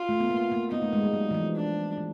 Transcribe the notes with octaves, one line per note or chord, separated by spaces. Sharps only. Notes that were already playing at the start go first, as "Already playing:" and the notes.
Already playing: F4
A3
B3
A#3
A#3
B3 D#4
A3
G#3
G3
F#3
E3
F3
D4
E3